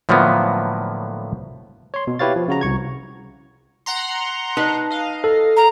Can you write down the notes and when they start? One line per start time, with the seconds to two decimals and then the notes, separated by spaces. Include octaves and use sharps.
0.09 A2 D3 F3 F#3 A#3 B3
1.94 C#5 C6
2.07 B2
2.19 E4 G4 B4 C#5 F5 A6
2.36 F3
2.48 C#3 F#4 A#5
2.61 C2 C#6 G#6
3.86 F#5 A#5 C6
4.57 D#4 B4 A5
4.90 D#5 F5
5.24 A4
5.57 A#5